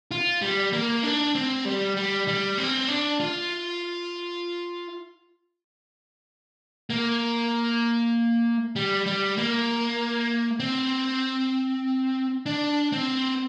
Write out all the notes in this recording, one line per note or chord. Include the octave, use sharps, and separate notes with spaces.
F4
G3
A#3
D4
C4
G3
G3
G3
C4
D4
F4
A#3
G3
G3
A#3
C4
D4
C4